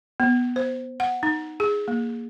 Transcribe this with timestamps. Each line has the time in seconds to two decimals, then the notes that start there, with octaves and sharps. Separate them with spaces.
0.20 B3
0.56 C5
1.00 F#5
1.23 D#4
1.60 G#4
1.88 A#3